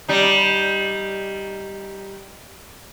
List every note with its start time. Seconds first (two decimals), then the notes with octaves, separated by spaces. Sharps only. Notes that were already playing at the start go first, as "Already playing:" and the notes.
0.08 G3 D#4